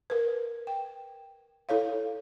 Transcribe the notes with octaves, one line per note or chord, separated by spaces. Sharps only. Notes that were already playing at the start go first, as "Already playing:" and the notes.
A#4 B4
G5
E4 A4 C#5 F5